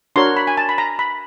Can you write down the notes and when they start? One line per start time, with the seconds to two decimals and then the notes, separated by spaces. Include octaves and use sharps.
0.16 D4 F#4 A#4 C#5 C6
0.37 B5
0.47 G#5
0.57 A5
0.69 B5
0.78 A#5
0.99 B5